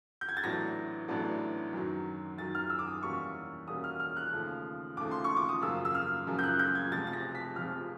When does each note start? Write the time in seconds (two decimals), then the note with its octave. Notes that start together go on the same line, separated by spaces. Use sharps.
0.21 G6
0.29 G#6
0.37 A6
0.44 A1 A2 F#3 B3 D4 A#6
1.08 A1 A2 F#3 B3 D4
1.73 F#2 D#3 F#3
2.38 F#2 D#3 F#3 A6
2.55 F6
2.70 E6
2.79 D6
2.87 D#6
3.03 E2 B2 G3 A#3 C#4 C#6
3.67 E2 B2 G3 A#3 C#4 D#6
3.84 F6
4.00 F6
4.17 F#6
4.32 D#2 C#3 F3 A3
4.97 D#2 C#3 F3 A3 D6
5.11 C6
5.24 C#6
5.37 D6
5.49 D#6
5.62 F#2 C#3 F3 A#3 E6
5.85 E6
5.95 F6
6.27 F#2 C#3 F3 A#3
6.39 G6
6.43 F#6
6.59 G6
6.75 G#6
6.91 F1 F2 C3 F3 G#3 A6
7.07 A6
7.13 A#6
7.35 B6
7.56 F1 F2 C3 F3 G#3 F6